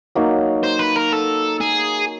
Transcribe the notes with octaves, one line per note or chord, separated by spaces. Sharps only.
F#3 A#3 D#4
C5
B4
A#4
A4
G#4